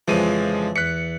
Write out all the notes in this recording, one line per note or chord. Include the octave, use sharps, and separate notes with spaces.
F2 C#3 E3 F3 G#3 D#7
E2 F#6 B6 C#7